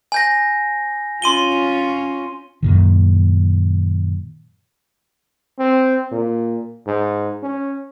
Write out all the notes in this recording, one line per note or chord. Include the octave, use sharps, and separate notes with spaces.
G#5 G6 A#6
C#4 F4 C6 D#7 G7
F#2 A#2 D#3
C4
A#2
G#2
C#4